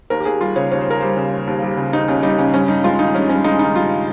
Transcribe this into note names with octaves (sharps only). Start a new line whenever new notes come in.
D#2 A#4
G4
D#2 G#4
G3 F4
C#3 C#5
D#2 C#5
C5
D#2 A#4
G3 C5
C#3
D#2
D#2
G3
C#3
D#2 D#4
D#2 C#4
G3 D#4
C#3 C#4
G2 C#4
G2 D#4
G#3 F4
D#3 D#4
G2 C#4
G2 C#4
G#3 D#4
D#3 D#4
G2 F4